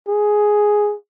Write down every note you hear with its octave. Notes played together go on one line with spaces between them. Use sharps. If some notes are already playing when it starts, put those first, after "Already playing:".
G#4